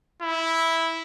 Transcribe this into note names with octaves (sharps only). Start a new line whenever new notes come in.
E4